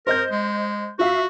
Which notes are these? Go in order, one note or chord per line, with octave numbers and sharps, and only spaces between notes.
A#4 C5 D#5 G6
G#3
F4 F#4 E5 F5